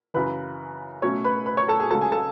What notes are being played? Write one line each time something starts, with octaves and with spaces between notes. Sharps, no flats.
F#2 C#3 E3 B4 B5
B2 F#3 A3 C#4 C#5 C#6
B4 B5
B4 B5
C#5 C#6
A4 A5
G#4 G#5
C#2 C#3 F#3 A4 A5
G#4 G#5
A4 A5